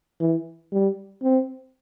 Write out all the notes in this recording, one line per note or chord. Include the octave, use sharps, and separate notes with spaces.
E3
G3
C4